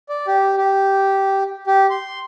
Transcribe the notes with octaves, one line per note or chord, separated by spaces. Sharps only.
D5
G4
G4
G4
C6